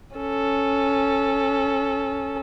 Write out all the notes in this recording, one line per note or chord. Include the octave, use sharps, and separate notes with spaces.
C#4 A4